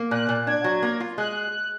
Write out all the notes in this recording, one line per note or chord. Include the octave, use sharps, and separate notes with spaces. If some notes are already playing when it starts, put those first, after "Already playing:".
Already playing: A#3
A#2 F#6
A#2
D4 G#6
F#3
A#3
F4
G#3 F#6